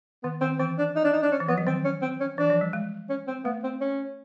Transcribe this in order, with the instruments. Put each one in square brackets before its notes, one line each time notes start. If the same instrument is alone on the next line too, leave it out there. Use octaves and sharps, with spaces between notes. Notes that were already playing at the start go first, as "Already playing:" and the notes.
[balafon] D#3 [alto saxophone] B3
[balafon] D#3 [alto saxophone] C4
[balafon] E3 [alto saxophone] C4
[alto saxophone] D4
D#4
D4
D#4
D4
C#4
[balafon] E3
[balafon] F3 [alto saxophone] B3
[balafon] F#3
[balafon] D#3 [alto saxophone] C4
[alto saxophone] C#4
C4
C#4
[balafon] E3 [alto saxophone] D4
[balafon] F3
G3
G#3
[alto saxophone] C#4
C4
[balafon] A3 [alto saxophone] B3
[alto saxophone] C4
C#4